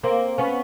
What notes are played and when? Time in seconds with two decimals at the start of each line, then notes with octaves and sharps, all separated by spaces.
0.03 A#3 C4
0.38 B3 C#4